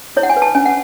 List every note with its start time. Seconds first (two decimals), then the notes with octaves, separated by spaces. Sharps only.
0.16 E4 C#5
0.23 F#5
0.30 G#5
0.37 B4
0.42 A5
0.55 C#4 G#5
0.66 F#5